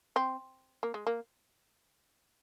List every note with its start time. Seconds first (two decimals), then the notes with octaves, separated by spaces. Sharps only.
0.16 C4
0.83 A#3
0.94 G#3
1.07 A#3